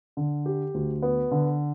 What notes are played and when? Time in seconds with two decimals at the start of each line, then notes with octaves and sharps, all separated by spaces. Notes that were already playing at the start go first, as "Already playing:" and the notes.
0.17 D3
0.46 G4
0.74 D2
1.02 B3
1.31 D3